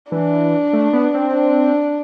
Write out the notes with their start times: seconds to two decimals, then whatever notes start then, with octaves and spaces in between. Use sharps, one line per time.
0.12 E3 D4
0.73 A3
0.93 B3
1.14 C4
1.34 D4